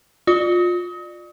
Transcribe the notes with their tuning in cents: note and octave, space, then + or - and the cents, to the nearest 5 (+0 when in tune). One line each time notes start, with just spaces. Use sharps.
F4 +20 D5 +30 D#6 +35